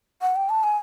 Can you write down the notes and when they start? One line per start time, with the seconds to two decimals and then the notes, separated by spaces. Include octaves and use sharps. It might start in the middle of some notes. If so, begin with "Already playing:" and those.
0.22 F#5
0.36 G5
0.49 A5
0.63 G#5